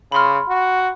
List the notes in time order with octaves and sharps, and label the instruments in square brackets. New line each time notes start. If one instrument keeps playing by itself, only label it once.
[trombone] C#3 [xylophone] B5 C6 F6
[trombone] F#4